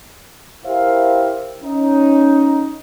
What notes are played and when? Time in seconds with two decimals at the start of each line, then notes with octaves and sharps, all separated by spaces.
0.65 E4 G4 A#4 C5 E5 F5
1.63 C#4 D#4